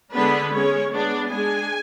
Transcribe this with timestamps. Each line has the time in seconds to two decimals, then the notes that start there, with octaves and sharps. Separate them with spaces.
0.12 D3 G#3 B3 D4 B4
0.52 G#3 C#4 C#5
0.92 G#3 B3 D4 D5
1.30 G#3 D4 G#5